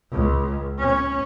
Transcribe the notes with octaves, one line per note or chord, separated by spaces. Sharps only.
C#2
C#4